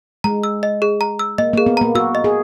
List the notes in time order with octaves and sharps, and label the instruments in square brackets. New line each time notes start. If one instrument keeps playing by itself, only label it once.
[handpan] G#3 [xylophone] A#5
[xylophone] E6
D#5
G#4
A#5
E6
[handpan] A#3 [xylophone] D#5
[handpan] A#3 [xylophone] G#4
[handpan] B3
[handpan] A#3 [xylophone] A#5
[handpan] F#4 [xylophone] E6
[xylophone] D#5
[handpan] G#4